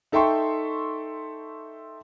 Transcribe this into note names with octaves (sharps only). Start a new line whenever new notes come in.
D#4 A4 E5 G5 C6 C#6